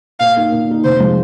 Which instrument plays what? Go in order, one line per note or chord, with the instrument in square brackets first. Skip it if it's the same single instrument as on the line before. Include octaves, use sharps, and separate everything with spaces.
[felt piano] A#2 [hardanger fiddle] F5
[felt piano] A#3 D#4
A#2
A#3 D#4
[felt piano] F1 [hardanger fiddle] C5
[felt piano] C3 F3 G#3